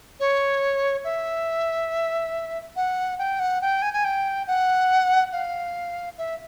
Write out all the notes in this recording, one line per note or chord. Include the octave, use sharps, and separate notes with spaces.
C#5
E5
F#5
G5
F#5
G5
G#5
G#5
G5
F#5
F5
E5